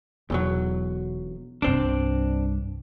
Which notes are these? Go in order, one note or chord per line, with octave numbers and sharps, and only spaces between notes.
E1 B1 E2 F#3
C2 G2 C4 D4